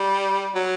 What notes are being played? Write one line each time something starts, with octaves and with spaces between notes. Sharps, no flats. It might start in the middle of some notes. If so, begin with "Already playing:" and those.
Already playing: G3
F#3